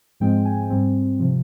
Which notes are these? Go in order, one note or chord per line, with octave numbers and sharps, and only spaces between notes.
G#2 F3 G#3 C4 G5
G#5
G#2 G3 C4
C3 F3